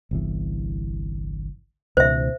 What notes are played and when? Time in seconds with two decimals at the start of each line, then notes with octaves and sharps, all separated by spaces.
0.11 G1 C2 E3
1.97 C#2 B2 D#3 C5 E5